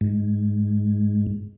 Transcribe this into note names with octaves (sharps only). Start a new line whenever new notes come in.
G#2